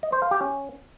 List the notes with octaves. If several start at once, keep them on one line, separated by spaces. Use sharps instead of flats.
D#5
C5
F5
G4
C#4